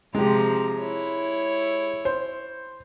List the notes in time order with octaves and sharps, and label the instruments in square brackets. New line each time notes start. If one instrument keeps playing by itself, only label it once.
[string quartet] C3 F3 A#5 [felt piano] G#3 G4
[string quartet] E4 C#5
[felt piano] C5